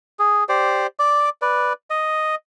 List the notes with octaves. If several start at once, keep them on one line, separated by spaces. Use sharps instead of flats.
G#4
G4 C5 D5
D5 D6
B4 D5
D#5